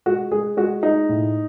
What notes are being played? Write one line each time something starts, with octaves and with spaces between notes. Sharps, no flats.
G#3 F#4
G#3 G#4
G#3 F#4
G#3 D#4
A2